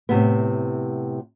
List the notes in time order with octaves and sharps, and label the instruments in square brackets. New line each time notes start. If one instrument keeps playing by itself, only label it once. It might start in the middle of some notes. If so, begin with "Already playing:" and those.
[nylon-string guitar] A2 C3 B3